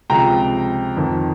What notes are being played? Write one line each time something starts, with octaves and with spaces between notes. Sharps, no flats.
C#2 C3 F3 G5 A#5
F2 D#3